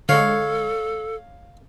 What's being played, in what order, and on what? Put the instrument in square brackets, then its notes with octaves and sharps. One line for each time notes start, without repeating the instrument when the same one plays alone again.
[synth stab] D3 G#3 [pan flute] A4 [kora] C#5 [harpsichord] F5